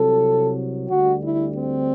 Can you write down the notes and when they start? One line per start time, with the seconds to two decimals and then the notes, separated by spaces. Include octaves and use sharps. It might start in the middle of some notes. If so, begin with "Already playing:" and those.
Already playing: C2 C3 F#3 A4
0.90 D2 D3 G3 F#4
1.23 E4
1.56 C4